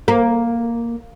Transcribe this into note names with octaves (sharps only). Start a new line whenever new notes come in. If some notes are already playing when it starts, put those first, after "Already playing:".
A#3